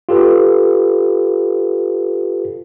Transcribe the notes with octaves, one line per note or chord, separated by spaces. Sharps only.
F4 G4 A4 B4